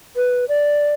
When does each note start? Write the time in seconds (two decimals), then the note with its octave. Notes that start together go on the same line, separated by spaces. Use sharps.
0.16 B4
0.49 D5